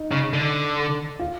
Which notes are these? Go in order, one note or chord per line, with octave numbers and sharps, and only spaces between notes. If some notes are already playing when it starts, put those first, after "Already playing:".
Already playing: D#4
C#3
D3
F4